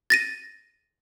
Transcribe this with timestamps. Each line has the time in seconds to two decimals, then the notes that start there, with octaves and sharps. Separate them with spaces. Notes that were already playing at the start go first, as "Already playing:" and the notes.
0.10 A6 A#6 D#7